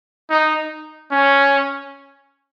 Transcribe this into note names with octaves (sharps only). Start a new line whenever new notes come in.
D#4
C#4